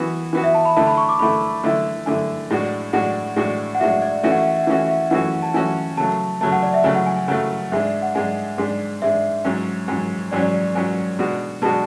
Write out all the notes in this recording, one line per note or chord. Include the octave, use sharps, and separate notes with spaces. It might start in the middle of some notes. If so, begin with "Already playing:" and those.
Already playing: E3 B3 F#4
E3 B3 F#4
E5
A5
B5
D3 A3 E4 A5
B5
C#6
D6
D3 A3 E4 B5
D3 A3 E4
D3 A3 E4 G#5
A2 G#3 D4 F#4
A2 G#3 D4 F#4 F#5
A2 G#3 D4 F#4
F#5
A2 G#3 D4 F#4 E5
D5
E3 A3 C#4 F#4 E5
F#5
E5
F#5
E5
F#5
E3 A3 C#4 F#4 E5
F#5
E5
E3 A3 C#4 F#4 F#5
A5
E3 A3 C#4 F#4 G#5
C#3 F#3 A3 A5
C#3 F#3 A3 A5
F#5
D5
E5
C#3 F#3 A3 G#5
F#5
G#5
G#5
C#3 F#3 A3 F#5
G#2 G#3 D4 E5
F#5
G#2 G#3 D4 G#5
G#2 G#3 D4
G#2 G#3 D4 E5
G#2 F#3 C#4
G#2 F#3 C#4
G#2 F#3 C#4 D5
D5
D5
G#2 F#3 C#4 G#5
B2 G#3 D4 F#4
B2 G#3 D4 F#4 A5